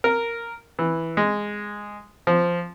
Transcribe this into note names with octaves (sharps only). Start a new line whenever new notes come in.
A#4
E3
G#3
F3